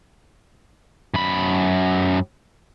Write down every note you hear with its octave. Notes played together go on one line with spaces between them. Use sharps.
F#2 B5